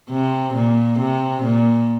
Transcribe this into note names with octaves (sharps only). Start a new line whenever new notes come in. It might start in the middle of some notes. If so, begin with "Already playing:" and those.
C3
A#2
C3
A#2